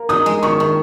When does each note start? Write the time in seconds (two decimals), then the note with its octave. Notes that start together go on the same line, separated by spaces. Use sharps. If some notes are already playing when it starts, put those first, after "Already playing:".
Already playing: A#3
0.09 D#4 D#6
0.26 G#3
0.43 D#3 C#6
0.60 D#3